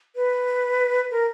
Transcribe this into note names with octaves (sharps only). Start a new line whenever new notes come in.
B4
A#4